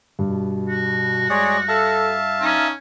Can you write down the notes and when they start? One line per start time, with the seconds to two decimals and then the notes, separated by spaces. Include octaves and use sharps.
0.19 G2 B2
0.68 F#4
1.30 G#3 G#4 C#5 D5
1.69 A4 E5 F5 A5
2.41 C#4 D#4